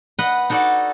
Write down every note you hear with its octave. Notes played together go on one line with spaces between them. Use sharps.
B4 D#5 F#5
D#4 F#4 A4 D5